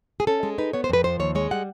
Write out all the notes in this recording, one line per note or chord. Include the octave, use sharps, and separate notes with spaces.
G#4
C#4 A4
G#3
D#4 B4
B3 C#5
C5
F2 B4
F3 C5
D#2 C#5
G#3 C#5
G3 F#5